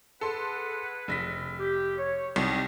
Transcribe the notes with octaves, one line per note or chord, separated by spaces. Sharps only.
G#4 A4 B4 F#5 C6
F1 A#6 B6
G4
C#5
C2 C4 D#4